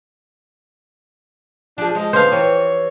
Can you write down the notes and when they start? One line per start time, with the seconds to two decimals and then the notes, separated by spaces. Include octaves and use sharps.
1.78 F3 D4 G#4
1.95 F3 G#3
2.13 D3 B3 C#4 C5 F5
2.32 E3 G4 C#5